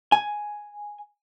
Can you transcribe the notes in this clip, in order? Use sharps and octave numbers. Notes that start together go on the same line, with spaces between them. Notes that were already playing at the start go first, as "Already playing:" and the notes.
G#5